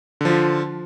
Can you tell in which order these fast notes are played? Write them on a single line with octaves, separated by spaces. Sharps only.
D3 F3 F4